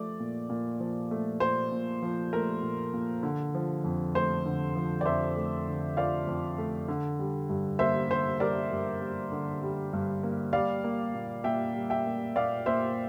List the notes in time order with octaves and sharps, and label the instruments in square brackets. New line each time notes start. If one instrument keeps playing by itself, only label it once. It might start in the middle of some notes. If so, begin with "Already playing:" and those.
Already playing: [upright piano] F3 A3 D5
A#2
A#2
F3
A3
A#2 C5
A#2
F3
A3 A#4
A#2
A#2
D3
F3
F2
A3 C5
D3
F3
D5
F2 C5 E5
A3
D3
F3 D5 F5
F2
A3
D3
G3
G2
A#3 C5 E5
D3 C5
G3 A#4 D5
G2
A#3
D3
G3
G2
A#3
G3 D5 F5
A#3
A#2
A#2 E5 G5
G3
E5 G5
A#3
A#2 D5 F5
A#2 C5 E5